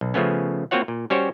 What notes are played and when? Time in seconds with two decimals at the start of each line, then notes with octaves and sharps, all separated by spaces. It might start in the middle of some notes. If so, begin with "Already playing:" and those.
0.01 B1
0.14 C#3 F3 A3 B3 C#4
0.71 A#3 C4 F4 F#4 C#5 F#5
0.88 A#2
1.10 G3 C#4 F#4 G4 C5 C#5